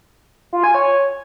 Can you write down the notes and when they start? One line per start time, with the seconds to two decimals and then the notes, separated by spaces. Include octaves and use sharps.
0.53 F4
0.64 G#5
0.75 C#5